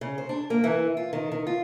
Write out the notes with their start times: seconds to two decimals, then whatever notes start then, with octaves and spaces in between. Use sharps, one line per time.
0.01 C#3
0.18 C5
0.29 D4
0.50 A#3
0.64 E3
0.97 F4
1.13 D#3
1.32 D#3
1.47 F4